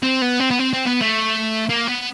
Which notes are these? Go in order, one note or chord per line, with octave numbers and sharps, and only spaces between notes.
C4
B3
C4
B3
C4
C4
B3
A3
A#3
B3